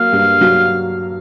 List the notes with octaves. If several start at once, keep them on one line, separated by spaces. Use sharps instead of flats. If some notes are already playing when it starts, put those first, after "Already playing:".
Already playing: F#3 A#3 F5
G2
F#3